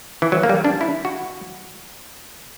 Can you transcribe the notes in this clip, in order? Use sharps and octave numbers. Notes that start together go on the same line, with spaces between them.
E3
F#3
A#3
G3
D4
E4
F#4